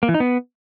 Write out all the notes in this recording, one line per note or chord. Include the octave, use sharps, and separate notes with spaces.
A#3
E3
D#4
B3